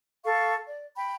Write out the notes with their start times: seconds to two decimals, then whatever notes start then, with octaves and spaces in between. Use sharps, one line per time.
0.24 A4 F5 C#6
0.68 D5
0.97 G5 B5